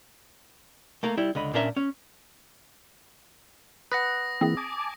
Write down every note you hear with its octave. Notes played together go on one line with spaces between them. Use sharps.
A3 A#3 A#4
G3 E4
C#2 D3 D#5 B5
A#2 C#4 D4 A#4 C5 E5
C#4
B4 F#5 D#6 A#6
E3 A#3 C4 E4 G#4
G#5 A5 D6 D#6